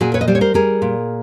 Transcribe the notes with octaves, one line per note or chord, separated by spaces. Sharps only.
A#2 F#4 G#4
B4 C#5
D#5
G3 C5 D5
C#5
A#4 C5
G3 G#4 A#4
A#2